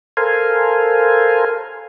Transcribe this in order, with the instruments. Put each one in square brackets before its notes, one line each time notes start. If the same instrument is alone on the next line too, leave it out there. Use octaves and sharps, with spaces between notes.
[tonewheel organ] A4 A#4 C5 F5 G#5